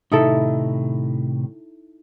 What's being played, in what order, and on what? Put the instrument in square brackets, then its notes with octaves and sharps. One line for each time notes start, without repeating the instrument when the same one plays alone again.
[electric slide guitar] A2 C3 D#3 [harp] D#4 E4 A4